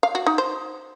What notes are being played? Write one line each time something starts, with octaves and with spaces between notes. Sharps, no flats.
F5
F#4
D#4
C5